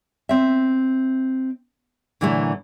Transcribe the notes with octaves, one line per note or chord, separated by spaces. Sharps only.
C4 E5
A#2 D3 E3 F#3 A3